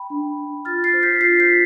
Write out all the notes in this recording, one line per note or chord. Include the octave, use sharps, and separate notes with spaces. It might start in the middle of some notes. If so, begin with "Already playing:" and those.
Already playing: G5 B5
D4
D4
F4 F6 A6
A6 C7
C5
G6 B6
F4 A6 C7
G6 B6
F4